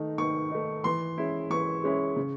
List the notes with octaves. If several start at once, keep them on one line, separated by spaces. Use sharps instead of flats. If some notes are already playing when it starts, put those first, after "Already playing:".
Already playing: D#3 A3 D#4
D#3 C#6
A3 D#4
E3 C6
G#3 C#4 E4
E3 C#6
G#3 C#4 E4
C#3